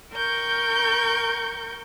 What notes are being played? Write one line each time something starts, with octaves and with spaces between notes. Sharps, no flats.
A#4 G5 C#6 G6